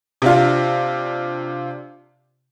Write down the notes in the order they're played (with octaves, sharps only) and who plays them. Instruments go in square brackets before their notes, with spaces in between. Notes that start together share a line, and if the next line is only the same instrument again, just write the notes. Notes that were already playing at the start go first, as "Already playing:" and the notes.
[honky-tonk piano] C3 D4 F4